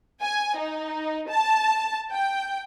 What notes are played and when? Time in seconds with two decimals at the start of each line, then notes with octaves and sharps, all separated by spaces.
0.22 G#5
0.57 D#4
1.29 A5
2.11 G5